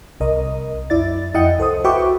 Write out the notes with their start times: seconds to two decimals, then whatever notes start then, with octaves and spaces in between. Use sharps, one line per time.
0.20 C2 A#4 D#5
0.90 F#2 E4 D5 A6
1.34 F2 E4 D#5 F#5 G5 C#7
1.58 C2 A4 C5 D#6
1.84 F#4 B4 E5 G5 C#6 D6